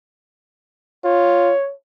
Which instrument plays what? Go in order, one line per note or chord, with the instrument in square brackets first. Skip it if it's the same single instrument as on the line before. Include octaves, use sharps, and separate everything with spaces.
[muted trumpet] F4 [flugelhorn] C#5